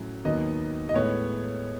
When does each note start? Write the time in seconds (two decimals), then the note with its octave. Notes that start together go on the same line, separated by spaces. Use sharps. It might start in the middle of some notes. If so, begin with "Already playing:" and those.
Already playing: A2 F#3 C#4
0.25 D#2 D#3 F#3 B3 D#5
0.89 D#5
0.94 A2 G#3 B3 C#5